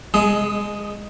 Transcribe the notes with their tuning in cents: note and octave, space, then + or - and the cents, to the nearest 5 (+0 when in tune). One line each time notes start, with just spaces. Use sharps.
G#3 -15 G#4 +20 D#5 +0